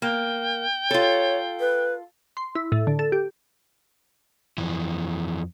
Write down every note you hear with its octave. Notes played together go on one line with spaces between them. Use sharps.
A#3 G5
F4 A4 C#5
B4
C6
E4
A2
D3
A4
G4
F2 E3